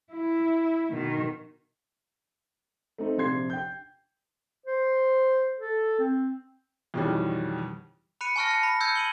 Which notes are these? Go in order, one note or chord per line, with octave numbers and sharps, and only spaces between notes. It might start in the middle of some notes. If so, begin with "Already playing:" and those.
E4
B2 D#3
A3 C4 D#4
A#1 C3 C6 G#6 C7
G5 G6
C5
A4
C4
F2 B2 D#3 E3 G3 C#4
B5 F#6 C#7 D#7
G#5 A5 C#6 F6 F#6 A#6
A5 C#7
B5
E6 G6 G#6 C#7
D#7 F#7 G7